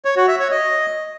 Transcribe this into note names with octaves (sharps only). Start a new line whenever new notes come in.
C#5
F#4
E5
C#5
D#5